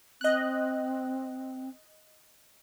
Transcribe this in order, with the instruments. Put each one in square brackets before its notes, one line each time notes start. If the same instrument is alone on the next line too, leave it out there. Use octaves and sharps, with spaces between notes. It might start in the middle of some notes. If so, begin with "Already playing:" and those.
[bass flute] C4 [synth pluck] D#5 F#6